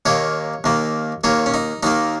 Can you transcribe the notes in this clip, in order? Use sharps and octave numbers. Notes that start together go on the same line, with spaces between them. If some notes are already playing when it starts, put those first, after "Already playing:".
D#2 D#3 A#3 C#5
D#2 D#3 A#3
D#2 D#3 A#3 C#5
C#4
D#4
D#2 D#3 A#3 D#4